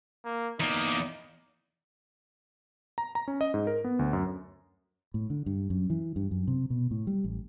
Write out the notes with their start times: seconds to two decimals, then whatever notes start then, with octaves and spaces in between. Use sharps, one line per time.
0.25 A#3
0.60 E2 A#3 D#4
2.98 A#5
3.15 A#5
3.28 C#4
3.41 D#5
3.54 G#2
3.67 A#4
3.84 B3
3.99 D2
4.13 F#2
5.14 A2
5.30 D3
5.46 G2
5.70 F#2
5.90 E3
6.16 G2
6.31 F#2
6.47 C3
6.70 B2
6.91 A2
7.07 G3
7.24 A1